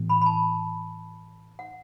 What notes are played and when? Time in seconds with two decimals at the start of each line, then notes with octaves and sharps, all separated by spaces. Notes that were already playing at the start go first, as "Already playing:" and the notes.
Already playing: A2 E3 B3
0.09 B5
0.22 B5
0.26 A5
1.59 F#5